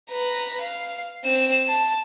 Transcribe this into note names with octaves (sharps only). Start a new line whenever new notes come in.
B4 A#5
F5
C4 E7
A5